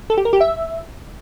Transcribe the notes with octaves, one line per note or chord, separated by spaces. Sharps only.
A4
G4
A#4
G4
E5